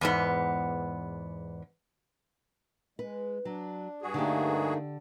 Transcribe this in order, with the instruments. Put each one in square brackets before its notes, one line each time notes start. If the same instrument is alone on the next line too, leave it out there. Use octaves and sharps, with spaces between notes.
[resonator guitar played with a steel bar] E2 G#2 B3
[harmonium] G#3 [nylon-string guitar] B4
[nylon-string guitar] F#3 [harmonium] D4
[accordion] G2 F#4 G#4
[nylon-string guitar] D3 D4 G4 [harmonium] A3 A#3 D#4